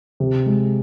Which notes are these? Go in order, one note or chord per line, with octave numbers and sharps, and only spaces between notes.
C3
G#3